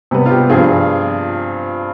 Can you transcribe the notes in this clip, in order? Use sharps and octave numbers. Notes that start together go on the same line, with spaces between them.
C3 G3 B3
F4
G4
G2 F3 C4 F4 G#4